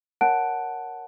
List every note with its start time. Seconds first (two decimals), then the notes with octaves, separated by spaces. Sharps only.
0.21 A#4 C#5 F#5 A5 F#6 D7